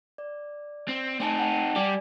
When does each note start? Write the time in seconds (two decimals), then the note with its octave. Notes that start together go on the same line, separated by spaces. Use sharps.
0.18 D5
0.89 C4
1.20 A3 C4 D#4 G#5 A5
1.39 F#5 G5 A5
1.76 G3 G4 D5 G#5